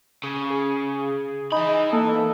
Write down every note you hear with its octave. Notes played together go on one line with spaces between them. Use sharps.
C#3 G#4
G#4
E3 D#4 B5
A#3 A4